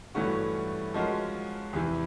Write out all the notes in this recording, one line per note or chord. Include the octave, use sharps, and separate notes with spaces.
G2 E3 A3 C#4 F#4
F3 G#3 C#4 F#4 A#4
E2 C3 E3